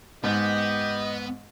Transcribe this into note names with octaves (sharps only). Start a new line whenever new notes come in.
G#2 B3 G4 D#5